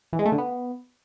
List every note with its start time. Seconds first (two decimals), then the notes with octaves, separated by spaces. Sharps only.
0.13 E3
0.19 G#3
0.25 A3
0.32 D3
0.38 B3